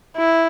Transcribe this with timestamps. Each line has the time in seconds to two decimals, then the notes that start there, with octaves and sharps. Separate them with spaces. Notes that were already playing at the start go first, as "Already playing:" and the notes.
0.16 E4